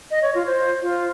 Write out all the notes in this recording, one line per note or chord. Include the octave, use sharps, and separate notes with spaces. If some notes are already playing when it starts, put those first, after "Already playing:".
D#5
C#5
F4
C5
F4